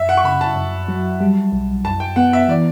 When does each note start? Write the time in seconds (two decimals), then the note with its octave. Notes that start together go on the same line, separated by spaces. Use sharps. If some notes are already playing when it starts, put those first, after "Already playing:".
Already playing: F#2 E5
0.09 F#5
0.17 C#6
0.24 C#3 B5
0.41 A5
0.56 F#2
0.88 F#3
1.20 G3
1.52 B1
1.84 F#2 A5
2.00 G5
2.16 B3 F#5
2.33 E5
2.48 E3 D5